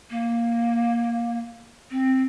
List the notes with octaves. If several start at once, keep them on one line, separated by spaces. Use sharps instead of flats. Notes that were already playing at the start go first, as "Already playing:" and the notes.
A#3
C4